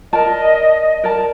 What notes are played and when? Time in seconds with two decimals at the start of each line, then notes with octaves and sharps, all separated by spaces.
0.13 A#4 D5 D#5 A5
1.04 A#4 D5 A5